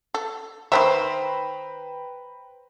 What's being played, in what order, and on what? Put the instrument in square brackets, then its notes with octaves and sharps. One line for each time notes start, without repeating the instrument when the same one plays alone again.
[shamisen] A4
[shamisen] D#3 A#3 E5 [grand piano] B4 G5 A#5 [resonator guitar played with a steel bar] C5